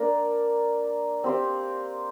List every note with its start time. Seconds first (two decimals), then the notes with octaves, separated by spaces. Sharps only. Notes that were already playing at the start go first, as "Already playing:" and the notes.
Already playing: A#3 D4 A#4 D5
1.24 C4 G4 C5 F5